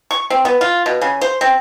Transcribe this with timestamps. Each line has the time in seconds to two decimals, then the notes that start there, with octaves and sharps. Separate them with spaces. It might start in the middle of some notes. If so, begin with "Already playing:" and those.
0.11 C#6
0.30 C4
0.45 B3
0.61 F4
0.86 B2
1.01 C#3
1.21 C5
1.41 C4